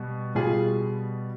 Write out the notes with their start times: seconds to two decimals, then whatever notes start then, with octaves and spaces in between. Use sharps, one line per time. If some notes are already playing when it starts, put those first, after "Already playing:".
Already playing: B2 G3
0.35 B2 G3 F4 G#4